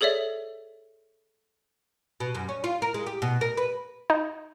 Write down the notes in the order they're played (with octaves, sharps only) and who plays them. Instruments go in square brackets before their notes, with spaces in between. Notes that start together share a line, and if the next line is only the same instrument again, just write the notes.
[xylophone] G#4 A4 C#5 D5 E5
[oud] B2
F#2
C#4
F4
A#4
G#3
G4
B2
A#4
B4
[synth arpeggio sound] D#4